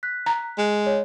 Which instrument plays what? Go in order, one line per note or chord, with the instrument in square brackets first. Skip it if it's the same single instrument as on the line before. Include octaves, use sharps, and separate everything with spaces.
[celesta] F#6 B6
[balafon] A#5
[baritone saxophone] G#3
[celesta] C#5